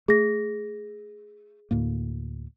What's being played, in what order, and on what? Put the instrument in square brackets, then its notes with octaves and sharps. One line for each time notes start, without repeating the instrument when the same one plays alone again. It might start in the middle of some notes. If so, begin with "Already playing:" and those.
[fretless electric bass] A3 [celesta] G#4 A#6
[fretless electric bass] D2 A2 A#3